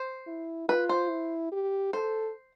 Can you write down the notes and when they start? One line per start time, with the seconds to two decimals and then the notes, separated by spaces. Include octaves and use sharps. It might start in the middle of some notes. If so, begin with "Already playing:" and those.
Already playing: C5
0.27 E4
0.69 F4 B4
0.89 C5
1.10 E4
1.52 G4
1.93 A4 C5